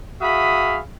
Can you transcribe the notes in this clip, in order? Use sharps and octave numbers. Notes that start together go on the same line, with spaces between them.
F#4 G#4 E5 F5 B5 D#6